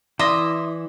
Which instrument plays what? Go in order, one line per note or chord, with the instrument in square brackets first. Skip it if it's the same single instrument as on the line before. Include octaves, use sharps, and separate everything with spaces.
[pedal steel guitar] E3 E4 [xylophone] D5 D6 A#6 [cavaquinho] E5 C6 D#6